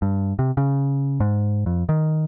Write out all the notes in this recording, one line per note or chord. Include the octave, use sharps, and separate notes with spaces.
G2
C3
C#3
G#2
F2
D#3